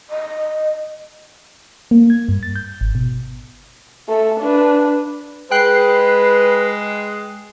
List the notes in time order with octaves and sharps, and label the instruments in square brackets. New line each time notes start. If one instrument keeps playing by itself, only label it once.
[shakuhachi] D#5
[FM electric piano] A#3
G#6
G2
A6
G6
G#1
B2
[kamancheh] A3 A4
D4 B4
[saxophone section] G#3 [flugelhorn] B4 [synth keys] G5 F#6 C7